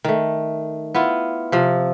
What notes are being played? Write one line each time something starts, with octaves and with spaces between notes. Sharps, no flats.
D#3 A3
B3 E4 F4
C3 F3